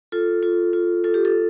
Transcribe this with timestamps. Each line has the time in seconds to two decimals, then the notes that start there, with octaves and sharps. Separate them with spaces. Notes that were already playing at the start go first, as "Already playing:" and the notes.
0.12 F4 A4
0.43 F4
0.73 F4
1.04 F4 A4
1.14 G4
1.25 A4